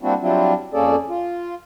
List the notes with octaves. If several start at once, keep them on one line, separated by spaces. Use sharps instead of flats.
G3 A#3 C4 D4 E4 F#4
F#3 G3 C4 D4 E4 F4
F2 A#3 C#4 G#4 A4 D5
F4